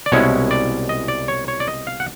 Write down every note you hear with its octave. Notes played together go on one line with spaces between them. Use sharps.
D5
C2 B2 G#3 C#4 E4 C#5
D5
D#5
D5
C#5
C#5
D5
D#5
F5
F#5